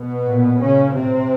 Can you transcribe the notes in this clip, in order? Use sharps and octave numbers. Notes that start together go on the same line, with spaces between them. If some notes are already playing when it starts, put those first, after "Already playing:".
Already playing: B2 B3
A#2
A#2 C#3 C#4
A2 C3 C4